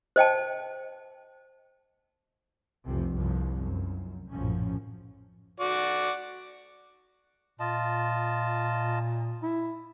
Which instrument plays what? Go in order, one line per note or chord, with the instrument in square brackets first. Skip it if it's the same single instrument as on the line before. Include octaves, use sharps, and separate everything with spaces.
[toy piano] C5 D#5 G5 A5
[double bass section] F1 C2 C3 F3
C2 G2 F3
F1 F#2
A#1 F#2 A2 F3 C#4
[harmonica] F#4 D5
[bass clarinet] A#2 [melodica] F4 D#5 A5
[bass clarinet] E4